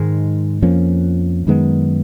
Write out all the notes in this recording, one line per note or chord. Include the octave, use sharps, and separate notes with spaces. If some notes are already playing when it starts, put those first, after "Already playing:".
Already playing: G#2 D#3 G#3
F2 F3 A#3 C#4
F#2 D#3 G#3 B3